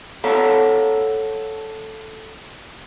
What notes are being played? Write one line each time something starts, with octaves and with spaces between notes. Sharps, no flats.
A4 C#5 F5 F#5 A5 A#5